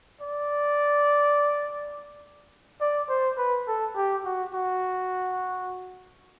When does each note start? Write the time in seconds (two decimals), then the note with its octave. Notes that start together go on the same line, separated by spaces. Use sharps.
0.21 D5
2.81 D5
3.09 C5
3.38 B4
3.67 A4
3.96 G4
4.25 F#4
4.53 F#4